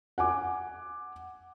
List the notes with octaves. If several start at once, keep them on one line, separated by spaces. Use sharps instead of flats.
F#5 G#5 D6